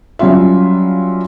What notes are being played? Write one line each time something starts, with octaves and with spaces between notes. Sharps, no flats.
F#3 G3 C#4 F4 E5